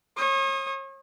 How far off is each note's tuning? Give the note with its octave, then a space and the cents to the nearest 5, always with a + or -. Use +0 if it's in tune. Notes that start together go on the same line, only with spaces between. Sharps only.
C#5 -40 D#6 +0